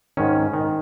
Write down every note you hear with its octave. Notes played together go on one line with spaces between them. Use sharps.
G#2 D#3 C#4
D#3